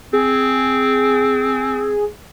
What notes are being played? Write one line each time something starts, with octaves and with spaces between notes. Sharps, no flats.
C4 G#4